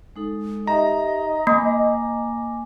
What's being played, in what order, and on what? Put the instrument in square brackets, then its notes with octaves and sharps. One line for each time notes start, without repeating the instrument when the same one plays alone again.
[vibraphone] G#3 D#4 A4
[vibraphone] D#4 G4 E5 [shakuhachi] D#5 [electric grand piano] A#5
[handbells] A#3 [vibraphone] G#5 D6